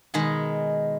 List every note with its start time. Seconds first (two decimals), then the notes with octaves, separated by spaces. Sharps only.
0.14 B2 D#3 G#3